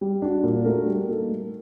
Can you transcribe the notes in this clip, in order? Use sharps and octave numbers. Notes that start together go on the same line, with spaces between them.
G3
D4 F#4
A#2
A3 D4 F#4 A#4
G3
A#3 D#4 A4
A3